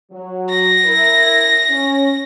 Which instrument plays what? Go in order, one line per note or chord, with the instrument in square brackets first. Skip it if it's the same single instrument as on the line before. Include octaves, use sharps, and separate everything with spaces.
[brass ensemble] F#3
[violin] A#6
[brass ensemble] E4 A#4
C#4